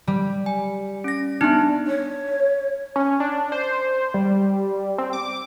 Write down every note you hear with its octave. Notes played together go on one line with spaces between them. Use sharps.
G3
G#5
C#4 A#6
B3 D4 D#4
C#5
C#4
D4
C5
G3
C4
D6